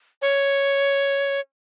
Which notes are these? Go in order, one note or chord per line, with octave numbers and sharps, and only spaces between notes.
C#5